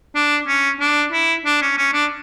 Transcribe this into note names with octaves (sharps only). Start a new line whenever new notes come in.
D4
C#4
D4
E4
D4
C#4
C#4
D4